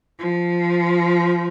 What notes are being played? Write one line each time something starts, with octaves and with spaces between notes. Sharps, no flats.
F3